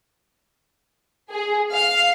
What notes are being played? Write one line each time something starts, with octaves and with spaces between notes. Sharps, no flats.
G#4
F5